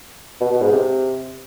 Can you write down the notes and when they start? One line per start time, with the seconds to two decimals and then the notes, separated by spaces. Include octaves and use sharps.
0.41 B2
0.51 B2
0.61 G#2
0.72 C3